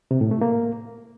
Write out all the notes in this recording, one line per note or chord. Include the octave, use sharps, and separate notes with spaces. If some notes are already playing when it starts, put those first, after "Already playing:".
C3
A2
A3
A#3